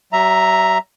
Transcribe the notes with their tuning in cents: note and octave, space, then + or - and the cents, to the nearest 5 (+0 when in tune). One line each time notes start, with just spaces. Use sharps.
F#3 +45 E5 +0 A#5 +0